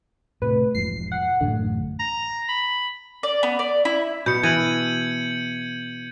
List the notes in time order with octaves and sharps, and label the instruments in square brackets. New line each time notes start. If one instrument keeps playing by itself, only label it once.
[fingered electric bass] A2 C3 [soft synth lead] B4
[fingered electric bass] E1 G#2 F3 [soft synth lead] C7
[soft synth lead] F#5
[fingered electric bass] A1 F#2 A2 [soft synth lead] D3
[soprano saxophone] A#5
B5
[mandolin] D5
B3
D5
E4
[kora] B2 [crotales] G6 C#7
[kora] E3 [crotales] G#6 D#7 F#7